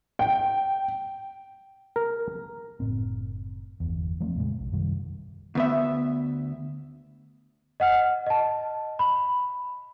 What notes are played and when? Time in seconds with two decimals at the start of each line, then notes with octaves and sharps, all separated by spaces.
0.19 G5
1.96 A#4
2.80 F#1 A2 C4
3.80 G1 E2
4.20 F3 A3 C4
4.35 F2 A#2 C#3 G#3
4.59 B1
4.72 F#2 C3 D#3 G3
5.55 D2 B3 E5
7.80 D#5 F#5 F6
8.27 D#5 A5
8.99 B5